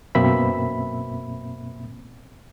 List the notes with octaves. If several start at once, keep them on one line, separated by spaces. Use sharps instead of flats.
F#2 B2 A#3 C4 E5 B5